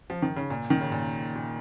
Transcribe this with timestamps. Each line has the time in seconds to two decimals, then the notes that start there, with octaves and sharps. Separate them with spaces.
0.10 F3
0.22 D#3
0.36 C#3
0.50 A#2
0.70 D#3
0.81 C#3
0.92 A#2
1.36 A#2